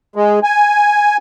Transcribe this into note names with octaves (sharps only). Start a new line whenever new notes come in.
G#3
G#5